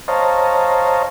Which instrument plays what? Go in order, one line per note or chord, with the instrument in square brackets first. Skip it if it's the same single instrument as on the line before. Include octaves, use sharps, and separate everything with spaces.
[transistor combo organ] C5 C#5 D#5 F5 A5 A#5